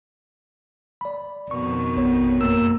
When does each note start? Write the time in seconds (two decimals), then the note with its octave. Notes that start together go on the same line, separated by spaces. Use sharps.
1.01 D5 B5
1.51 F2 B2 D#3 C#6
1.96 A1 B3 C#5
2.41 F#2 A#3 E6